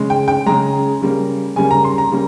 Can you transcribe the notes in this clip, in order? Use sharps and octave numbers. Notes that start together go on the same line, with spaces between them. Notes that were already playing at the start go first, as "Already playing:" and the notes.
Already playing: C#3 G#3
G5
G5
C#3 G#3 A#5
C#3 G3 A#3
C#3 G3 A#3 G#5
A#5
C6
A#5
C#3 G3 A#3